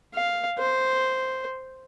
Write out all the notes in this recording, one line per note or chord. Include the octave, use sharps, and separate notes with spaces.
F5
C5